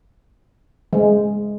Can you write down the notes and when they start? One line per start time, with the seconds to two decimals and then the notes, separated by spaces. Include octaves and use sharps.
0.93 G#3